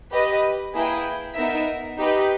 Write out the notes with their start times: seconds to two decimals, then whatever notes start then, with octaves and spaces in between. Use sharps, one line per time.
0.12 G4 B4 D#5
0.74 A#3 E4 G#4 B4 G5
1.36 B3 D#4 A#4 E5
1.98 D#4 G4 B4